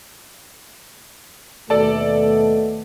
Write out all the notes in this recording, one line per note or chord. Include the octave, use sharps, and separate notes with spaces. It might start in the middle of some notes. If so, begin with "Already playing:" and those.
D#2 B2 A3 A4 D5 A5